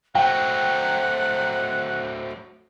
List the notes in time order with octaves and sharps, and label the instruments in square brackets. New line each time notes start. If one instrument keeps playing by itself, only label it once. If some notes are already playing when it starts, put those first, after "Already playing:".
[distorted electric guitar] F#3 A3 [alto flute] C5 [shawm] F#5 [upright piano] G5